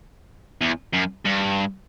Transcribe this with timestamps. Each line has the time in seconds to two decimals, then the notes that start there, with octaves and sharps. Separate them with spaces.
0.61 E2
0.94 F#2
1.26 G2